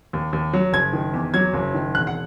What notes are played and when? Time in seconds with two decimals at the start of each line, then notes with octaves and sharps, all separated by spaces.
0.13 D#2
0.33 D#2
0.53 F#3
0.73 F#1 G#6
0.93 D#3
1.14 E2
1.34 F#3 G#6
1.54 F#1
1.74 D#3
1.94 E1 F#6
2.07 F#5